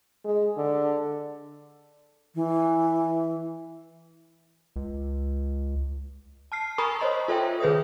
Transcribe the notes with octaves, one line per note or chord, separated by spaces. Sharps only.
G#3
D3
E3
C#2
A5 F6 C7
A#4 G#5 A#5 B5 C#6 D#6
C5 C#5 D#5 A#5 C6
F4 A4 C5 E5 G5
D#3 G#4 B4 C#5 D#6